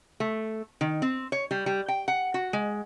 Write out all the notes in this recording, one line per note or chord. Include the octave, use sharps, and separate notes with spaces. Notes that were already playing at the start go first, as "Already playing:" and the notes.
A3
D#3
C4
C#5
G3
G3
G5
F#5
F#4
G#3